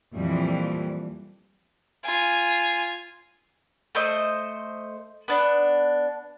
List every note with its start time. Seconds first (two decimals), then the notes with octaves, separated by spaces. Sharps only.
0.14 F2 A#2 E3 G3
2.05 F4 G#5
3.95 A3 C5 D#5
5.28 B3 D4